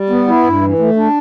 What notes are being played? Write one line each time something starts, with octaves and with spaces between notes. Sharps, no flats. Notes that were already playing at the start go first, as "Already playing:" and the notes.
Already playing: G3
B3
E4
G2
E3
A3
D4